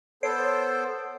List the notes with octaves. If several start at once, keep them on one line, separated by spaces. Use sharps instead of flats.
B3 A4 C5 C#5 C7 D7